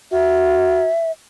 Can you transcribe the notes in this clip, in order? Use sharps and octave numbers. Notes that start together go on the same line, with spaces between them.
F#4 E5